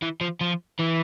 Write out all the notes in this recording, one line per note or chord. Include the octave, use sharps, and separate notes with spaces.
E3
F3
F3
E3